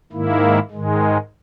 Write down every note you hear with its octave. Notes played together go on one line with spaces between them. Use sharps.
G#2 D#3 A#3 E4
G#2 D#3 G#3